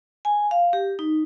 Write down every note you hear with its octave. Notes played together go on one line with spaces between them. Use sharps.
G#5
F5
G4
D#4